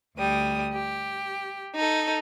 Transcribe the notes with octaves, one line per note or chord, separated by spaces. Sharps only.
D2 G3 D#6
G4
D#4 A4